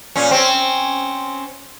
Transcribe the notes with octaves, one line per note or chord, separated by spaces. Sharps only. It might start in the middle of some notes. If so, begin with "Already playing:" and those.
A#2 C#4
C4 C#4